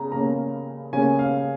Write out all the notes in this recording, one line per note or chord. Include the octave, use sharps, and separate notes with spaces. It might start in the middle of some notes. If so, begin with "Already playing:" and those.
Already playing: C#3 A#5
C#3 A#3 C#4 A#5
C#3 A#3 C#4 G#5
F5